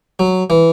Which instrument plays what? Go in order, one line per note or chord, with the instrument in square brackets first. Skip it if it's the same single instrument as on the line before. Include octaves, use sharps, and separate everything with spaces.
[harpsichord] F#3
E3